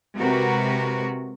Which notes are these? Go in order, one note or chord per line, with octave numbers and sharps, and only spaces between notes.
C3 G#3 F#4 A#4 B4